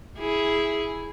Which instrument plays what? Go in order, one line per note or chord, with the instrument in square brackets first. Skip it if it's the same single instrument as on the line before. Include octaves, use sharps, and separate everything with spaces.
[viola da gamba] E4 G#4